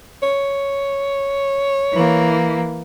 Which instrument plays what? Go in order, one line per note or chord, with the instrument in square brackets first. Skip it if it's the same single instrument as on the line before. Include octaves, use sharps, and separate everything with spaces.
[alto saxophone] C#5
[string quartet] E3 A#3